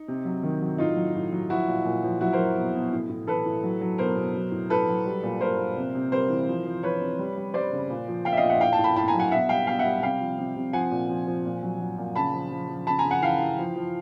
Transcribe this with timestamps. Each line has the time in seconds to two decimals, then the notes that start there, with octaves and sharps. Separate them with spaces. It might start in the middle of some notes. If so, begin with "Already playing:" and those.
Already playing: D#4
0.08 C3
0.25 F#3
0.43 D#3
0.62 F#3
0.78 A2 D#4 F4
0.96 F#3
1.15 A2
1.32 F#3
1.50 F3 E4 F#4
1.68 A#2
1.85 A#2
2.03 F3
2.21 F#3 E4 F#4
2.33 A#4 C5
2.39 F#3
2.57 B2
2.75 B2
2.93 A2
3.09 A2
3.27 E3 A4 B4
3.46 A2
3.64 F#3
3.81 F#3
3.98 B2 A#4 C5
4.16 B2
4.34 F#3
4.52 A2
4.70 A2 A4 B4
4.88 F#3
5.05 G3
5.23 A#2
5.41 A#2 A#4 C5
5.58 A#2
5.77 C3
5.95 C3
6.12 G3 A#4 C5
6.30 E3
6.48 F3
6.66 F3
6.83 F3 B4 C#5
7.01 C3
7.19 G3
7.37 G3
7.54 G3 C5 D5
7.72 C#3
7.90 A#2
8.08 F3
8.25 A#2 F5 G5
8.32 E5
8.37 D#5 F5
8.43 A#2
8.49 E5 F#5
8.60 A2 F5 G5
8.73 G5 A5
8.79 A2
8.84 A5 B5
8.96 A2 A5 B5
9.08 G#5 A#5
9.14 F#3
9.19 F#5 G#5
9.31 B2 E5 F#5
9.49 G3 F5 G5
9.67 B2 F5 G5
9.79 E5 F#5
9.85 G3
10.02 C3 F5 G5
10.20 F3
10.38 C3
10.56 C3
10.73 F3 F#5 G#5
10.91 A#2
11.09 F3
11.27 F3
11.45 A#2
11.62 F#3
11.81 F#3
11.98 A#2
12.15 C#3 A5 B5
12.34 F3
12.51 F3
12.69 F3
12.87 C#3 A5 B5
12.99 G#5 A#5
13.05 C#3
13.11 F#5 G#5
13.22 E3 F5 G5
13.41 E3
13.58 F3
13.76 F3